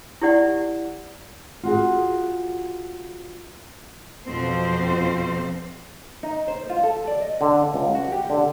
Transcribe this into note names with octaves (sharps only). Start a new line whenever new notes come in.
E4 G4 D5 F#5
F4 F#4 G#4
F2 B2 F3 C4 C5
D#4
C5
F4
A4
D5
D#5
D3
C#2
F#4
G4
D3